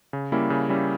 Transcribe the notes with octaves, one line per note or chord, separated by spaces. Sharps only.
C#3
G3 A#3 C#4 E4
C#3
G3 A#3 C#4 E4